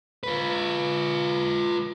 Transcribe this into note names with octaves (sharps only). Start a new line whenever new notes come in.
F4 B4